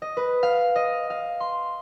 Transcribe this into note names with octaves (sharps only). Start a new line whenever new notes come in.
D#5
B4
F5
D#5
F5
C6